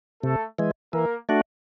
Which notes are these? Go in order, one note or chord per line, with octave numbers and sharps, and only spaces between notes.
C3 A3 A4
E3 G#3
E3 A#3 A#4
A3 D4 F#4